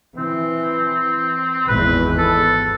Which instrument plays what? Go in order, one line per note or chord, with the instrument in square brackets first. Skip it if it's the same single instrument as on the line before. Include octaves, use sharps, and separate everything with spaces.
[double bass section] E3 [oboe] C4
[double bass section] G#1 E2 [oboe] B4
[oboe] A4